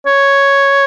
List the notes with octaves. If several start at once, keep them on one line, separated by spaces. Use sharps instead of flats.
C#5